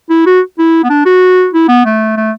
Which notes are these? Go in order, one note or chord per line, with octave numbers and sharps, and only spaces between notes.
E4
F#4
E4
B3
D4
F#4
E4
B3
A3
A3